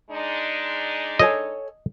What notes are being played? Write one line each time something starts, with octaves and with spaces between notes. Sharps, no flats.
G#3 D4 D#4
A4 C#5 D#5 G#5